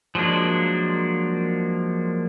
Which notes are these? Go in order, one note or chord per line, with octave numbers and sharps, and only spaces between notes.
F3 F#3 G#3 A#3 D4